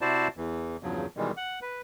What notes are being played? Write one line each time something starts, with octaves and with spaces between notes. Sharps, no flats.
C3 E4 F#4 C5 D5 A5
E2 E3
E2 G2 C#3 F3 F#3
B2 D#3 E3 G3 G#3
F#5
B4